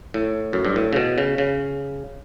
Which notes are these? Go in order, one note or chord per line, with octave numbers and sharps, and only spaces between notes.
A2
F#2
G2
A2
C#3
B2
C#3
C#3